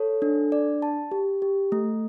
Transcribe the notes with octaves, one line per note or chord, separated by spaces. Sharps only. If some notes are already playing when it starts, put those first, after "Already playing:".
Already playing: A4 C#5
D4
D5
A5
G4
G4
A3